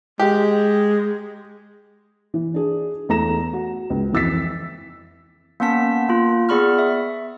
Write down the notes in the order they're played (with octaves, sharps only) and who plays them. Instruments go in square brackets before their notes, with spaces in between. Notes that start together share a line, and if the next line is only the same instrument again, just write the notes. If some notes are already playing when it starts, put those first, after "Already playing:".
[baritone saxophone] G#3 [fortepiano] G4
[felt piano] E3
D4 G#4
E2 A3 A#5 A#6 E7
F#4
C#2
F2 E3 E6 A6 B6
[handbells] A#3 B3 C#4 F#5 A5 B6
A#3 F4
B3 G#4 D5 B5 C#6 F6
E5